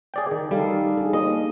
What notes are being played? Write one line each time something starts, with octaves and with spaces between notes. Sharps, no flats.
G#4 D5 G5
D#3
G3 D#4 A4 F5
D4 D#4 G#4
A#3 D#5